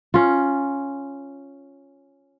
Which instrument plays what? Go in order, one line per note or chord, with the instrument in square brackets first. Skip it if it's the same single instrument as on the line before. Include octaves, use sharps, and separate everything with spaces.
[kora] C#4 F4